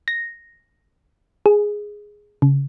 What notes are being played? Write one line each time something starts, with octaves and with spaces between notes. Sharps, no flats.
A#6
G#4
C#3